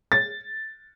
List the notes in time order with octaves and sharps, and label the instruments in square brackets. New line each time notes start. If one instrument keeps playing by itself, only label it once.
[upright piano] A6